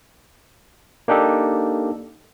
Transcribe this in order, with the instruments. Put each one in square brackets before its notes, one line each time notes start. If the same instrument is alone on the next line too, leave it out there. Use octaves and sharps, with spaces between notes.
[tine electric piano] A#3 D4 D#4 G4 A4